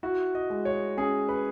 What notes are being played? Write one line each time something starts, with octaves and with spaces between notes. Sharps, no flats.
E4 F#4
D#5
G#3
C#5
C#4 G#4
B4